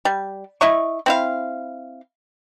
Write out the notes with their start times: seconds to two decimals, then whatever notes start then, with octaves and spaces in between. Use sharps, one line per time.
0.05 G3
0.61 E4 D#5 E5 C#6
1.06 C4 E4 F5